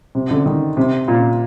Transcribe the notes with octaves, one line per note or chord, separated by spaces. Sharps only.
C3
D3
D#3
C3
A#2